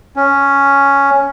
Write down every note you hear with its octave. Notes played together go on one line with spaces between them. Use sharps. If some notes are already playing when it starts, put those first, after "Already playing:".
C#4